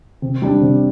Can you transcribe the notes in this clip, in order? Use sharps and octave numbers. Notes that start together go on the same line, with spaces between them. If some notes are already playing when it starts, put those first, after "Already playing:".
C3
G3 D4
C3